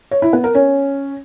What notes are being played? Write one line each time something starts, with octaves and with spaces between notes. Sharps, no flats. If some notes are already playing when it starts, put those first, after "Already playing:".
C#5
E4
B3
A#4
C#4